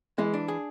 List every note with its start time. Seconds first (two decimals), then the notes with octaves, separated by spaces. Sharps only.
0.18 E3 G#3
0.34 D4
0.48 G#4